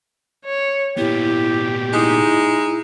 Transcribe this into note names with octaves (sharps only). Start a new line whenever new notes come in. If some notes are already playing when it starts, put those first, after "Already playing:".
C#5
A#2 B3 E4 G4
G#3 D#4 E4